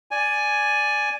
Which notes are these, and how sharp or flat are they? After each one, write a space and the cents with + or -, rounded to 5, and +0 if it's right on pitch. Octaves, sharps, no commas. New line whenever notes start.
D5 +0 G#5 +5